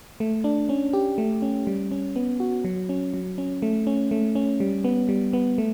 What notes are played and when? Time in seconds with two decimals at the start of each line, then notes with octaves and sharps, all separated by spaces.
0.20 A3
0.44 D4
0.69 C#4
0.93 G4
1.18 A3
1.42 C#4
1.67 G3
1.91 C#4
2.16 B3
2.40 F#4
2.65 F#3
2.89 C#4
3.14 F#3
3.38 C#4
3.62 A3
3.87 C#4
4.11 A3
4.35 C#4
4.60 G3
4.84 B3
5.09 G3
5.33 B3
5.58 A3